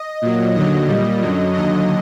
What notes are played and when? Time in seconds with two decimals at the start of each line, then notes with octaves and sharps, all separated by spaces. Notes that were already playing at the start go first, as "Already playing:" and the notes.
Already playing: D#5
0.22 A#2 F#3
0.55 D#2 D3 F#3 D#5
0.88 A#2 G3
1.21 F#2 D3 F#3
1.54 D#2 D3 F#3 D#5